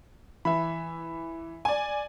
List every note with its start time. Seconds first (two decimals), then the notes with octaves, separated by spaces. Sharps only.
0.45 E3 E5 B5
1.65 D5 G#5